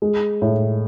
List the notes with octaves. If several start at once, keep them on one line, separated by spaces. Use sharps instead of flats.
G#3
A2